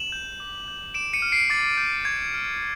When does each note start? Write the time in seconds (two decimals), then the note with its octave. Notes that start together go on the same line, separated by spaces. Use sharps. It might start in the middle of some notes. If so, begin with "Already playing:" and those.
Already playing: E7 F#7
0.12 G6
0.40 D6
0.68 G6
0.94 D6 D7 E7
1.13 C#7 D#7
1.22 F6
1.32 C7 D7
1.50 D6 A6
1.77 G6
2.05 C#6 G#6
2.34 F6